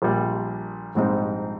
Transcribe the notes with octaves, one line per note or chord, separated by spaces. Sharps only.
A#1 A#2 G3
A#1 G#2 G3 C4 D#4